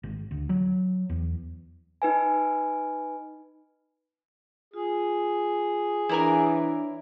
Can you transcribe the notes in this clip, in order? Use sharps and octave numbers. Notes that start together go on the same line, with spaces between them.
G#1
D2
F#3
E2
D#4 B4 G#5
F4 G#4
E3 D4 E4 A#4 C#5 D5 G#5